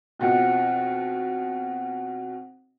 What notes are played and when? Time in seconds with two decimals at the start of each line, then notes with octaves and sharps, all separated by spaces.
0.20 B1 B2 F3 C4 F#5